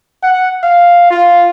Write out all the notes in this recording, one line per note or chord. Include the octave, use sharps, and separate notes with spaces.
F#5
F5
F4